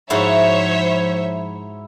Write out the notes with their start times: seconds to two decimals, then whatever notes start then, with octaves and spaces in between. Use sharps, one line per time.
0.10 G#2 F3 E4 F#4 C5 C#5 E5 F5